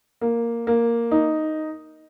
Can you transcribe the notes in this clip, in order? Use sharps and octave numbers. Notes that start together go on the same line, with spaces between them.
A#3
A#3
D#4